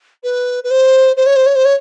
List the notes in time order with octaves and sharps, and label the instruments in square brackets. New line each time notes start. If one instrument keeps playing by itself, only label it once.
[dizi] B4
B4
C5
C5
C#5
C5
C#5
C5
C#5